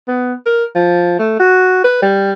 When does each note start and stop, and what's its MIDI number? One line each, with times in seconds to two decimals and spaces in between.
0.08 0.33 59
0.46 0.64 70
0.75 1.18 53
1.19 1.39 57
1.40 1.81 66
1.84 2.02 71
2.02 2.32 55